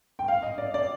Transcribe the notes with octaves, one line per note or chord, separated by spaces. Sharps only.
G5
F5
D#5
D5
D5